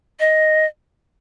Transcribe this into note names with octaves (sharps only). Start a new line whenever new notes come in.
D#5